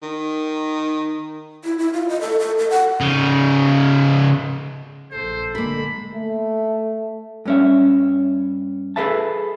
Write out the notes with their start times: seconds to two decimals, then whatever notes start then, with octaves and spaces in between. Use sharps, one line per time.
0.03 D#3
1.64 E4
1.78 E4
1.93 F4
2.09 D#5
2.21 A4
2.39 A4
2.58 A4
2.70 F#5
3.01 C#3 D#4
5.12 A#1 A4 C5
5.55 F#1 D3 G#3 A#3 A#4 B5
6.14 A3
7.45 G2 C#4 E5
8.96 G#4 A4 B4 E5 A5